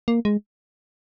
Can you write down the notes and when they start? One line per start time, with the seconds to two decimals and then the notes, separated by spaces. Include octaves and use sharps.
0.08 A#3
0.25 G#3